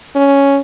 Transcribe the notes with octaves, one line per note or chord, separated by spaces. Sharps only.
C#4